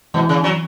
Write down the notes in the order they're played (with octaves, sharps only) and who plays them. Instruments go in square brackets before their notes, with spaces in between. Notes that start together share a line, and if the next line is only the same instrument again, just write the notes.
[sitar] B2 [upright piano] E3
[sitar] C#3
F#3